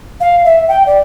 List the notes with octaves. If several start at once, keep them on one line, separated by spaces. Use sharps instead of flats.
F5
E5
G5
D5